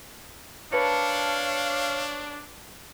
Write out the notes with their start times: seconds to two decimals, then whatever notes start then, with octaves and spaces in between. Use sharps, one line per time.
0.73 D4 A#4 B4 C#5 F5 A5